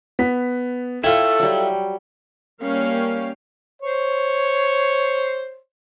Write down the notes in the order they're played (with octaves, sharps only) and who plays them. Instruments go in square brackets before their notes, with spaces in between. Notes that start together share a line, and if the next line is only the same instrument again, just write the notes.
[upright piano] B3 B6
[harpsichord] E4 F4 [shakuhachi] A4 [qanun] C#5 [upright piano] G5
[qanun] F#3 G3
[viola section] G3 A#3 C#4 C#5 F5 G5
[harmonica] C5 C#5